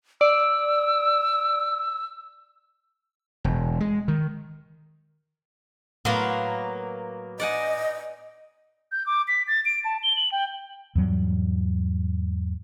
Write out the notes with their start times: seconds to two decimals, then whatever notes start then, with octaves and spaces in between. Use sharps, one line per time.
0.21 D5 E6
3.44 E1
3.80 G#3
4.08 D#3
6.05 A2 F#3 A#3 B3 C6
7.40 D5 D#5 F#5 G#5
8.92 G6
9.06 D6
9.28 B6
9.48 A6
9.65 D7
9.85 A5
10.03 G7
10.17 F#7
10.32 G5
10.95 E2 G#2 F#3 G3